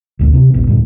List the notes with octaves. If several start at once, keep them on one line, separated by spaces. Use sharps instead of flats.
G#1 D2 A#2
C3
D#1 A1 B3
D2 G2 A#2